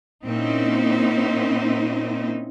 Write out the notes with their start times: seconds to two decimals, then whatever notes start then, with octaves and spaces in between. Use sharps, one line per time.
0.24 A#2 C4 C#4 D#4 E4